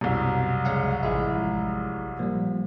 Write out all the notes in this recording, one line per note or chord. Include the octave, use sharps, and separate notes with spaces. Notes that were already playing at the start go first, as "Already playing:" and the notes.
C2 F#2 B2
C#2 G#3 C#5 F5 F#5
A1 F3 G#3 E4
A#2 F3 G3